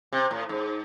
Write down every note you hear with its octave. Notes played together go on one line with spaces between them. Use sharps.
C3
A2
G#2